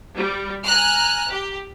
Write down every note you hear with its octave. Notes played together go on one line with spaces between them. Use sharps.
G3
G#5 A#5 F6 F#6
G4